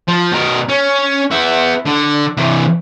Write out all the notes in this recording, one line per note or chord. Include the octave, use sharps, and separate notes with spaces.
F3
B2 A#4
C#4
B3 E5
D3
C3 E3